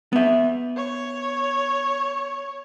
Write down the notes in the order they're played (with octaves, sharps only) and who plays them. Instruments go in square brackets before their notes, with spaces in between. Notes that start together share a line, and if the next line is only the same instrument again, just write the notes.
[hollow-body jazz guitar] B3 E5
[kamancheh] C#5